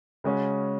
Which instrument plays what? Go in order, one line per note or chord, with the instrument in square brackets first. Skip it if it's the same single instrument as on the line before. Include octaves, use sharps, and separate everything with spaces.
[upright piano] C#3 G#3 C#4 F#4